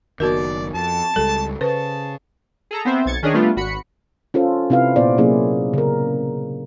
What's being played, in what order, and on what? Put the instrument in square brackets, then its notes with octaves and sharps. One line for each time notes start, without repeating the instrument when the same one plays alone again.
[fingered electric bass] F#1 D#3 [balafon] B3 F#4 A#4 [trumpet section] D5
[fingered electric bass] F2 [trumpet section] A5
[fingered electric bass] C#2 G3 G#3 [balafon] A4
[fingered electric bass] C#3 [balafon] B4 C5 [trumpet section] A5
[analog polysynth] G#4 A4 A#5
B3 C4 C5 E5
B1 G#6 A6 C#7
D#3 C#4 D4 G#4 C#5 D#5
G3 A3 B3 D4 F4
G#1 F#4 B5 C#7
[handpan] C#4 F4 A4 C5
C3 C4 E4 B4 F5
A#2 B3 E4 C5 D5
C3 F#3 A#3 C#4 E4 G#4
C#3 A#4